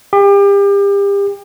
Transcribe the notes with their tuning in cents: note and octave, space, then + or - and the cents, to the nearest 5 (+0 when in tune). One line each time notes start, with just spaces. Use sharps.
G4 +35